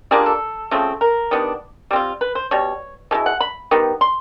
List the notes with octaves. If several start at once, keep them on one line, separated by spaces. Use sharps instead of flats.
G3 A#3 D4 F4 G#4
A4
C#3 F3 A3 C4
A#4
D#3 G3 B3 D4
G3 C4 F4
B4
C5
B2 G3 C#5
B2 G#3 E4
F#5
B5
D#3 G3 B3
C6